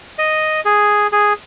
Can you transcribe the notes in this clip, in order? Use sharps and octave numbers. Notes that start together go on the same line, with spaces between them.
D#5
G#4
G#4